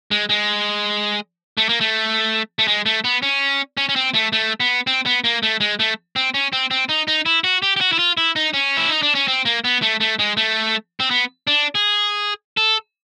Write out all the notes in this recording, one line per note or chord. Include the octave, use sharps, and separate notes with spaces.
G#3
G#3
A3
A#3
A3
A3
G#3
A3
B3
C#4
C#4
C#4
C4
A3
A3
B3
C4
B3
A#3
A3
G#3
A3
C4
C#4
C4
C4
D#4
D#4
E4
F#4
G4
G4
F#4
E4
F4
E4
D#4
C#4
E4
D#4
D4
C#4
C4
A#3
B3
A3
A3
G#3
A3
C4
B3
D4
G#4
A4